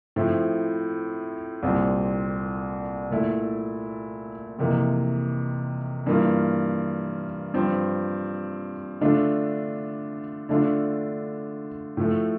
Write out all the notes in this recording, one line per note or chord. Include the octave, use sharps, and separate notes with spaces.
A2 F3 C4 E4
C2 A#2 G3 C4
A#2 A3 E4
F2 C3 E3 A#3
G2 E3 A#3 F4
G2 F3 C4
D3 A3 D4 F4
D3 A3 D4 F4
A2 F3 A3